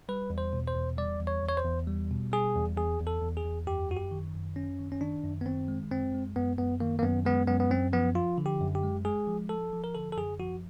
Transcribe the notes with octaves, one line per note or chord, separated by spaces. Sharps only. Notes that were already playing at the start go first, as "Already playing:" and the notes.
G3 B4
E2
C5
B2
C5
E2
G3 D5
E2
C#5
E2
C#5
C5
E2
G3
B2
G3 G#4
E2
E2 G#4
E2
A4
E2
G#4
E2
F#2 G4
F#2 F#4
G4
D#3
F#2
F#2 C#4
D#3
C#4
D#3 D4
F#2
B3
D#3 C4
G#3
F#2 C4
G#3
F#2 B3
F#2 B3
D#3 A#3
A#3
F#2 B3
G#3 B3
F#2 B3
B3
F#2 C4
F3 B3
F3 F4
D3
G4
F#2
G4
G#3
G#3 G#4
F3
F3 A4
F3
A#4
D3 A4
A4
F#2 G#4
F3 F#4